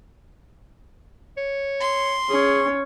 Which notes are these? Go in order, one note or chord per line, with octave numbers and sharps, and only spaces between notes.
C#5
C6
C#4 G#4 C#5